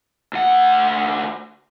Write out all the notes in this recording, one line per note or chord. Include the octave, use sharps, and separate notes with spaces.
D2 F#5